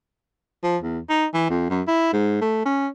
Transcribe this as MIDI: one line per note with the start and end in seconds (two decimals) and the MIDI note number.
0.64 0.77 53
0.83 0.99 40
1.10 1.26 63
1.34 1.49 52
1.50 1.65 41
1.70 1.82 42
1.88 2.13 64
2.13 2.38 44
2.41 2.65 57
2.66 2.87 61